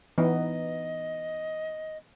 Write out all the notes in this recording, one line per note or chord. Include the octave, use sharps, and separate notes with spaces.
E3 B3 D#4 D#5